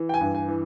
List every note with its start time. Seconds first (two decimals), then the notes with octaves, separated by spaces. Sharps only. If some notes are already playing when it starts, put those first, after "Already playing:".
Already playing: E3
0.09 G5
0.14 G#5
0.21 G2
0.35 G#5
0.48 E3